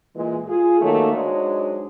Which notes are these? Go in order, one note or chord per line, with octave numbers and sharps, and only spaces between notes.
A#2 E3 G#3
F4 G#4
D#3 F#3 A3 A#3
G#2 F#3 G#3 D4